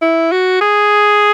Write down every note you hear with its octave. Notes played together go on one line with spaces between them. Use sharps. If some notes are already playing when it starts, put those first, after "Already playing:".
E4
F#4
G#4